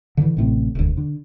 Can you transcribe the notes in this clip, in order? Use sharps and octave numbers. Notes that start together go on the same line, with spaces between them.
D3 E3
A1 A2 C3
E1 D2
D3